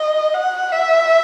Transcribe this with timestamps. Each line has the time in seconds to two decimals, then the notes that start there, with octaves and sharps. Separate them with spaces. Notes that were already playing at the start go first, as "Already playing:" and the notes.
Already playing: D#5
0.34 F#5
0.72 E5